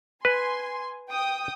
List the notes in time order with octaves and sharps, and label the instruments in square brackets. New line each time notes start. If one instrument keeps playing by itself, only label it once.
[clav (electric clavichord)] B4 [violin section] G#5 C6
[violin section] G5 D#6